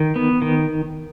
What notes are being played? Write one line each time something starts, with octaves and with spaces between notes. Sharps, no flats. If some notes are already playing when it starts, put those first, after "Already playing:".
Already playing: D#3
B3
D#3